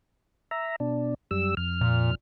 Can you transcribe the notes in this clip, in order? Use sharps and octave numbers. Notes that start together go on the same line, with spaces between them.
E5 A#5
B2 D4
F#2 G3 E6
F2 F6
A#2